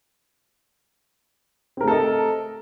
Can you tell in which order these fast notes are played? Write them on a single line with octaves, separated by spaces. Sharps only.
C4 A#4 A3 A4 D#5